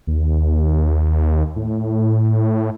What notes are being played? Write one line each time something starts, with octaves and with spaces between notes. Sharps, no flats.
D#2
A2